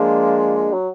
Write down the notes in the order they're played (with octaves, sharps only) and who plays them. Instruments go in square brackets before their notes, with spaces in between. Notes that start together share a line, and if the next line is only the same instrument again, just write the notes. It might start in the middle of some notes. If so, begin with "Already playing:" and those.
Already playing: [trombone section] F3 A#3 D4 F4 [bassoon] G#3
[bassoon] F#3